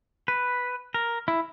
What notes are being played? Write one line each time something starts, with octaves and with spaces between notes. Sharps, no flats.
B4
A#4
E4